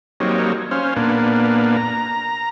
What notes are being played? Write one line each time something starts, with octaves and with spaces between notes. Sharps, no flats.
F#3 G3 A#3 C4 D#4 C#5
C#4 C5 F5
A#2 A#3 B3 D4
A#5